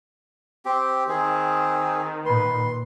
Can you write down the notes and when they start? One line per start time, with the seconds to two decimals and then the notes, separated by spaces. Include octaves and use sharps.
0.65 C4 G4
1.09 D#3 C4 G#4
2.26 A#2 B4 C6